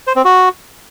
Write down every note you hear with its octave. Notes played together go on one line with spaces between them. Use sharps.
C5
C4
F#4